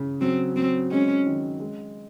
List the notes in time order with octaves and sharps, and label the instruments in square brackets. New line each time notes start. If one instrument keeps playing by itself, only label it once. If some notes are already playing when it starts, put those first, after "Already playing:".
Already playing: [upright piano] C#3
[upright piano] F#3 [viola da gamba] C4
[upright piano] F#3 [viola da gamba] C4
[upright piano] G#3 [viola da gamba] C#4
[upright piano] D#3
G#3